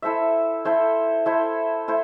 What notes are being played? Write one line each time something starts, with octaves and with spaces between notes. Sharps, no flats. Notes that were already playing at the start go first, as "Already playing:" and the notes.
E4 A4 C5 E5
E4 A4 C5 E5
E4 A4 C5 E5
E4 A4 C5